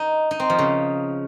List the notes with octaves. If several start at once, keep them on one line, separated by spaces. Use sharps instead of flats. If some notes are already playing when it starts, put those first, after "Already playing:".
Already playing: D#4
D#4
C4
F3
C#3